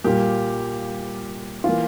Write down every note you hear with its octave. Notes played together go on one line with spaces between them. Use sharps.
A#2 G3 A#3 G4
E3 A#3 F4